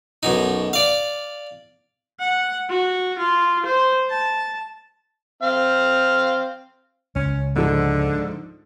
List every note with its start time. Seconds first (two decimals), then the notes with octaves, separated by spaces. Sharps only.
0.23 B1 F#2 D#4
0.73 D5 F5
2.20 F#5
2.69 F#4
3.19 F4
3.66 C5
4.09 A5
5.43 C4 F5
7.16 C#2 C#3 C#4
7.56 G#2 D3 F3 A4